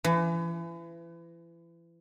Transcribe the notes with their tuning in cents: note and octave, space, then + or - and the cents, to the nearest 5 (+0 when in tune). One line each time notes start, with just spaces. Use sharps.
E3 +35